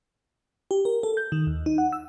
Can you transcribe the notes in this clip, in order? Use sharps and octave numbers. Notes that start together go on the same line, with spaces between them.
G4
A#4
A4
G6
D#3
D#2
D#4
F#5
E6